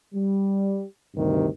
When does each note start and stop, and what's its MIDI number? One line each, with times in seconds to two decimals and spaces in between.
0.14 0.86 55
1.15 1.48 38
1.15 1.48 43
1.15 1.48 48
1.15 1.48 51